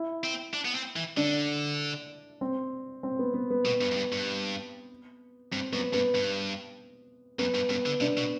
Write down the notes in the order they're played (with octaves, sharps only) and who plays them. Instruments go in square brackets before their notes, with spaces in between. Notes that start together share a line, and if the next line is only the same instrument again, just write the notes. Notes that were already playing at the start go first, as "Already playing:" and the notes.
Already playing: [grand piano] E4
[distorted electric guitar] C4
D4
B3
C4
E3
[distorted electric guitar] D3 [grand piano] D4
[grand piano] C4
C4
B3
B3
B3
[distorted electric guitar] B2 [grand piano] B3
[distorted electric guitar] G2
F#2
G2
G2
[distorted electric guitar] G2 [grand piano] C4
[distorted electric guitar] F#2 [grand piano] B3
[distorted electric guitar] G2 [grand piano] B3
[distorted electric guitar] G2
[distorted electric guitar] F#2 [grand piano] B3
[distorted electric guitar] G2
[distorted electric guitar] G2 [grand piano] B3
[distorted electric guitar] D3
[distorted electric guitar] C3 [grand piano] D4
[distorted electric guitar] B2